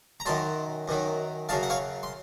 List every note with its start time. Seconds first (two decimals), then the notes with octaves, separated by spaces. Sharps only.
0.20 A#5
0.26 F#2 D#3 F#3 A5 C6
0.88 F#2 D#3 F#3
1.49 F#2 C#3 F#3 F5 A5
1.63 F#5
1.70 C#5 F5
2.03 C6